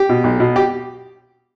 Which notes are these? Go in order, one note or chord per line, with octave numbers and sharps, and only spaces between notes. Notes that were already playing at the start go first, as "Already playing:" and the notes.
Already playing: G4
B2
B1
B2
G4